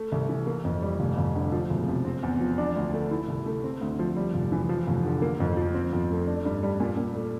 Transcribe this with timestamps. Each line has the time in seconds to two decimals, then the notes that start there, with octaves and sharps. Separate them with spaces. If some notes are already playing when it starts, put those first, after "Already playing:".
Already playing: A3
0.12 C2
0.29 E3
0.47 A#3
0.65 F2
0.82 G3
1.00 F1
1.18 F1
1.35 D3
1.52 F3
1.70 E1
1.88 C3
2.05 C4
2.23 E2
2.41 F3
2.58 D4
2.76 D2
2.93 A3
3.11 E4
3.28 C2
3.46 A3
3.64 C4
3.81 D2
3.99 F3
4.16 G3
4.34 F1
4.52 E3
4.69 F3
4.87 F1
5.05 D3
5.22 A#3
5.40 F2
5.57 F3
5.74 C4
5.93 F2
6.11 A3
6.27 D4
6.45 G2
6.63 G3
6.80 A#2
6.97 A#2
7.15 A3